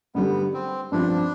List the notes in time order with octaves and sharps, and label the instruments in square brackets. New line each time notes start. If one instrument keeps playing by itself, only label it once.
[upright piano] G2 D3 G3 [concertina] B3
[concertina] C4
[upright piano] G2 F3 C4 [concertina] D4